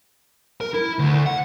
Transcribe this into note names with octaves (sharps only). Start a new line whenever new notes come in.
A#4
E4
D2
F#5